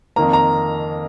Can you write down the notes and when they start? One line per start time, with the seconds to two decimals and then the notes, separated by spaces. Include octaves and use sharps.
0.16 F2 D#3 A#3 A#5
0.33 A#5